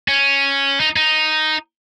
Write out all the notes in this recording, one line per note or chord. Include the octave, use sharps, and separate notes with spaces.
C#4
D#4
D#4